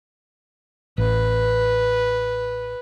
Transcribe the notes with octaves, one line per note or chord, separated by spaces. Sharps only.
A1 B4